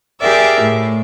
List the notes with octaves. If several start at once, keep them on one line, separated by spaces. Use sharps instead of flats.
G4 G#4 A#4 D5 E5
A2